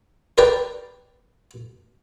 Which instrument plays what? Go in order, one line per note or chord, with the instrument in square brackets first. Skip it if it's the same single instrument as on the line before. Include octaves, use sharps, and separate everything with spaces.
[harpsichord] A#4 B4 D5 G5